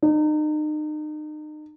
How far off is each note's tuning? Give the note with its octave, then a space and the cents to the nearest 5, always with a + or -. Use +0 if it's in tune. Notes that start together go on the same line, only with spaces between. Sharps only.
D#4 -35